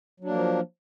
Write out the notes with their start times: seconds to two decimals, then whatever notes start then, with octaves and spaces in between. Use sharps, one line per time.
0.20 F#3
0.24 D4
0.29 A#3
0.33 F3